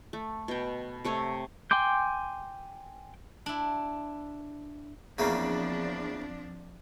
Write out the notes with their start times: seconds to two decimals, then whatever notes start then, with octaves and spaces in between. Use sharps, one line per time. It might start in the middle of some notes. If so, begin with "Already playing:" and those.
0.13 A3
0.48 B2 G5
1.05 C3 A3 C4 C#5
1.71 G5 G#5 C6 D6 G6
3.46 D4 E4
5.18 E2 C#3 F3 A#3 C4 D4